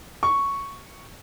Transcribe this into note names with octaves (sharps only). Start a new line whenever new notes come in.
C#6